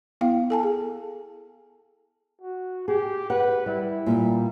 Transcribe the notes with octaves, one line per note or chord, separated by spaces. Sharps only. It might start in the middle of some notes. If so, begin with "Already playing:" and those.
B3 E4 F5 G5
A4 G#5 A5
G#4
F#4
G4 G#4
B4 F#5
G3 E4
A#2 G3